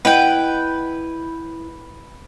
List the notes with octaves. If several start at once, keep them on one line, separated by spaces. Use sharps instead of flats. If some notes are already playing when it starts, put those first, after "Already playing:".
E4 B4 D#5 F#5 G5